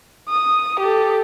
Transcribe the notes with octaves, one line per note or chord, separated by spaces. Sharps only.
D#6
G4 A4